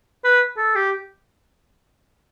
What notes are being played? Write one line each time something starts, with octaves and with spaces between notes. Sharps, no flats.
B4
A4
G4